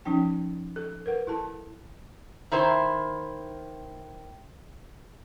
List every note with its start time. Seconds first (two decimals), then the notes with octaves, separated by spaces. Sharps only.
0.05 F3 C#4 D#4 G5
0.76 A4
1.06 A#4 B4 F#5
1.27 E4 A4 A5
2.52 D#3 E4 C5